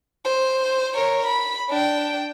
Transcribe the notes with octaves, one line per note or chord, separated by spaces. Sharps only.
C5
A#4 C#5
B5
D4 G5